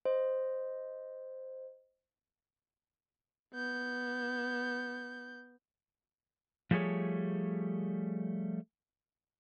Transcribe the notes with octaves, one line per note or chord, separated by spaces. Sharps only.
C5 D#5
B3 G6
F3 G3 A3 G#4 C#5